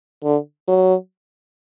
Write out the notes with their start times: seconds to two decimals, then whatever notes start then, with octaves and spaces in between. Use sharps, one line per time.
0.23 D3
0.68 F#3